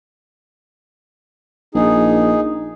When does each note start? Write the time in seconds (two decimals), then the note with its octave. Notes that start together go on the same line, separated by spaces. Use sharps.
1.75 A#1 D#4 G#4